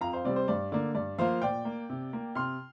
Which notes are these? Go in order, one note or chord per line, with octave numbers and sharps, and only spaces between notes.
F2 F5 A#5
C5 F5
C3 G3 C4 D5
C5
G2 D5
D3 A#3 D5
G2 D5
F3 A#3 C5 F5
A#2 D5 G5
A#3
C3
A#3
C3 C6 F6